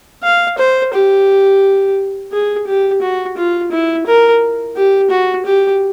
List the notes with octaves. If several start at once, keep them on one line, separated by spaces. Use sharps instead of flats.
F5
C5
G4
G#4
G4
F#4
F4
E4
A#4
G4
F#4
G4